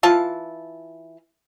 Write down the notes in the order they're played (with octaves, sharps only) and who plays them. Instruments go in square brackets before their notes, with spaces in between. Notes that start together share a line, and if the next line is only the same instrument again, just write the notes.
[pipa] E3 F4 A5